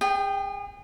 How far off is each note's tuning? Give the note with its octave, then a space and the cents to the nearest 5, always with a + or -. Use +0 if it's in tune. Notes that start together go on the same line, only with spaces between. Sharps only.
G#4 -35 G5 +0